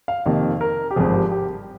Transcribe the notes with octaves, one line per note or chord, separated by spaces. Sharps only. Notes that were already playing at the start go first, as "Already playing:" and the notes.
F5
F2 C3 D#3 A#3 F5
A#4
G4
G#1 G2 F3 G#4
G4
G4